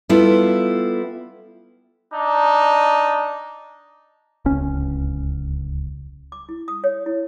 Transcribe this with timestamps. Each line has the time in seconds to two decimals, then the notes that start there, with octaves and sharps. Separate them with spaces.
0.09 G3 B3 E4 F4 A4
2.12 D4 D#4
4.45 D1 C#2 C#4
6.32 D6
6.49 E4
6.68 D#6
6.84 C#5
7.06 E4